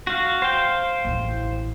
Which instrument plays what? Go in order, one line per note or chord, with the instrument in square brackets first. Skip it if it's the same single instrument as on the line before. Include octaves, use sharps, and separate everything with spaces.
[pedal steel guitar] F#4 F5
C5 F5 G5
[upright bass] A1 E3